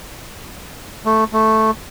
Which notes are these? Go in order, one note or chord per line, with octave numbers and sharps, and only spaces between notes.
A3
A3